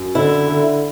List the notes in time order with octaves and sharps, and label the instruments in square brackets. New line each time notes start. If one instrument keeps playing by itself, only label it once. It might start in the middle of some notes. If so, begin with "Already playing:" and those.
Already playing: [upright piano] F#2
[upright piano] D3 [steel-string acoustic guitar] E4
[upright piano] D3